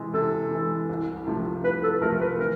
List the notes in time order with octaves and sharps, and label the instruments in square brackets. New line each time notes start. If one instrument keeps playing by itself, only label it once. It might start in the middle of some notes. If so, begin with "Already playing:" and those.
Already playing: [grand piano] C3 E3 G#3
[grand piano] C3 [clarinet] A4
[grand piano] E3 G#3
C2
C3 F3 A3
[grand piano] C2 [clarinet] B4
[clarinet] A4
[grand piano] C3 F3 A3 [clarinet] A#4
[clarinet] B4
[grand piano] E3 [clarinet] A#4